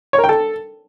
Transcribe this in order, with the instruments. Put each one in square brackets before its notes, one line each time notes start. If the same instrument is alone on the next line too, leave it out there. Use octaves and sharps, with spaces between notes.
[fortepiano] C#5
A#4
G5
A4